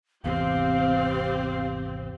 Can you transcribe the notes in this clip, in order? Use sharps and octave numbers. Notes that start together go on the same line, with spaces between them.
G#1 E2 C3 C4 G4 F5